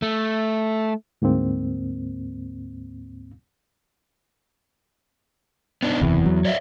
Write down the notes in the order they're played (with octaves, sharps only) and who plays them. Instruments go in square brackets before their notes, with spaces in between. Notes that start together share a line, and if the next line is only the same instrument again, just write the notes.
[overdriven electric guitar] A3
[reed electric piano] D2 G#2 A#3 C4
[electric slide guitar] B3 D4 D#4
[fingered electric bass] F#1 C3 E3 [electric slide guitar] E2
[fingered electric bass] F#3
[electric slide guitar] C#5 D5 E5